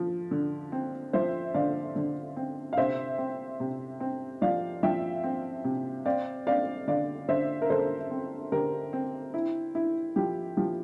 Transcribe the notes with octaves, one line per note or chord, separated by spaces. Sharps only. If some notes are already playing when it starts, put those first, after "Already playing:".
Already playing: F3
D3
C4
F3 C5 E5
D3 D5 F5
D3
C4
F5
C3 C5 E5
C4
C3
C4
F3 D5 F5
F3 E5 G5
C4
C3
C4 D5 F5
C4 D5 F5
D3 D5 F5
D3 C5 E5
A#4
D3 A4 C5
C4
D3 G4 A#4
C4
E4
E4
F3 G4
F3 G4